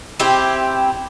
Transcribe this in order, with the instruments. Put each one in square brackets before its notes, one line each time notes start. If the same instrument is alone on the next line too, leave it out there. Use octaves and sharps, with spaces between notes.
[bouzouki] C4 E4 G4